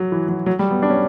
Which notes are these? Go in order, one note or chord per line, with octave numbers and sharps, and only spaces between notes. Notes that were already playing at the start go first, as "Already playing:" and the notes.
Already playing: F#3
E3
F#3
F#3
G3
B3
D4
C#4